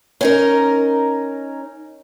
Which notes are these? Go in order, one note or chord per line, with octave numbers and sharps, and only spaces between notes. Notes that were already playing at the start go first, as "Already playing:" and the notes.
C#4 D#4 A#4